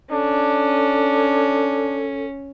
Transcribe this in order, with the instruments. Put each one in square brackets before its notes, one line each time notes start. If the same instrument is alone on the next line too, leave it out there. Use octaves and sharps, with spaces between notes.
[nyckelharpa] C#4 [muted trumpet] D4 [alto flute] A4